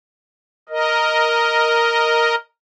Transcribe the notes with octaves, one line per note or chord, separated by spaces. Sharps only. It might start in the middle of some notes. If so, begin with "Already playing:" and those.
A#4 D#5